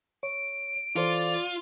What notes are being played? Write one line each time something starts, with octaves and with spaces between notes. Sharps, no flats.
C#5 D7
E3 F4 A4 C5 D5